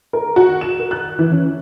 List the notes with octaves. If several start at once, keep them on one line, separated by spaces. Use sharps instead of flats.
A#4
F#4
E7
A#4
F#6
E3
C#4